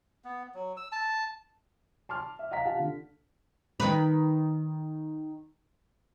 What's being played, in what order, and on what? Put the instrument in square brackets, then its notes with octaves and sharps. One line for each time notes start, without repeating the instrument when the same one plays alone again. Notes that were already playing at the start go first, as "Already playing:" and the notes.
[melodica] B3
F#3
E6
A5
[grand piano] A5 C6 D6 F6
E5
D#5 F5 F#5 A#5 B6
F4 G4 F5 F#5 A5
D3
[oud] D#3 B4